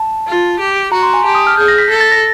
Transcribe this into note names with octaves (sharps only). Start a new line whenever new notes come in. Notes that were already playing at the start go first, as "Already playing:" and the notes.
Already playing: A5
F4
G4
F#4 A#5
C6
G#5
G4 A5
D#6
F6
G#4 G6
A#6
B6
A4 A#6
A6
A#6